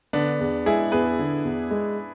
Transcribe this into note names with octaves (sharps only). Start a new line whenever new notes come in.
D3 B3 D4
E2
G#3 E4 G#4
E2 G#4 B4
D3
E2
G#3